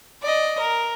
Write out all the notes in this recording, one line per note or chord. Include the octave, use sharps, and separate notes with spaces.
D5 D#5
A#4